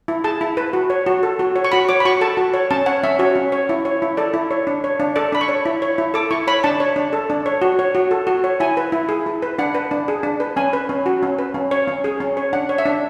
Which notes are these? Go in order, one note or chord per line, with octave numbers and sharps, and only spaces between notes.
E4
G#4 A5
E4
B4
F#4
C#5
F#4
A4
F#4
C#5
C#6
F#4 B5
C#5 D6
B5
F#4 C#6
A4 A5
F#4
C#5
C#4 A5
C#5 F#5
C#4 E5
F#4 C#5
C#4
C#5
E4
C#5
E4
A4 D5
E4
C#5
D4
C#5
D4
A4 D5
D4 B5
C#6
C#5
E4
C#5
E4
A4 D6
E4 C#6
C#5 B5
D4 A5
C#5
D4
A4
D4
C#5
F#4
C#5
F#4
A4
F#4
C#5
E4 G#5
B4
E4
G#4
E4
B4
D4 F#5
B4
D4
G#4
D4
B4
C#4 G#5
B4
C#4
F#4
C#4
B4
C#4
C#5
C#4
G#4
C#4
C#5
D4 F#5
C#5
E5
D4